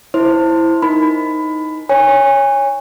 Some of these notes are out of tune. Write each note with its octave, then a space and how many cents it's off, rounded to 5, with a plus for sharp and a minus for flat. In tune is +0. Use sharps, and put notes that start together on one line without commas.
E4 +0 C5 +0 C6 +0
D#4 +5 A#4 +0 B5 +20
C#5 +0 G#5 -25